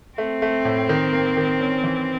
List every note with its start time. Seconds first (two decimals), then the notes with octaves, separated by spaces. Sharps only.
0.18 A3 C4
0.42 A3
0.65 A2
0.89 D#3
1.13 A#3
1.37 D#3
1.60 C#4
1.84 E3